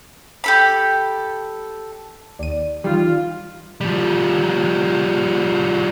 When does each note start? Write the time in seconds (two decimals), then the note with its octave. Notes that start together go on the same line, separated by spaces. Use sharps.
0.44 G4 A4 B5
2.39 D#2 D5 D#7
2.84 D#3 E3 G3 D#4 F4
3.81 F3 G3